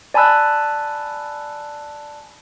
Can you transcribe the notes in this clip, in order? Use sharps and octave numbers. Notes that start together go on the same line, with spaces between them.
D5 G#5 A5 B5 E6 F#6